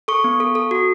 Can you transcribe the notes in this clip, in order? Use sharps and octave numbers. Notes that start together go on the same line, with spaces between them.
A4 C#6
B3
A4
A4
F#4